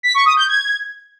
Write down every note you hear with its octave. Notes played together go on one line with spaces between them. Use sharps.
B6
C#6
D#6
G6
G#6